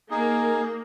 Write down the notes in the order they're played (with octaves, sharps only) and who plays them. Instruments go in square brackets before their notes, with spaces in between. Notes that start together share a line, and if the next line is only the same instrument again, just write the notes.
[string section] A#3 [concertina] D#4 G#4